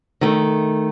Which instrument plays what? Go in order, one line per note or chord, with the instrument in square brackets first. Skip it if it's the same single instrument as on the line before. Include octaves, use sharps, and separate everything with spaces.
[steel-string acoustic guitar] D#3 A3